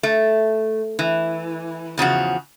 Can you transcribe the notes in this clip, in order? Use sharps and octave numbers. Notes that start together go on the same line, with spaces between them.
A3
E3
E2 C#3 F3 F#4